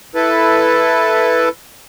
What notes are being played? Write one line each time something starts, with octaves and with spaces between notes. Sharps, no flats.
E4 A4 B4